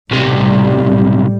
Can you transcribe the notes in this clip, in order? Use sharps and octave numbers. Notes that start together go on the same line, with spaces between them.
B1 A2 C3 G3